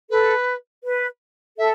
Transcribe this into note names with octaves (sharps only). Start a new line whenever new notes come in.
A4 B4
B4
A4 E5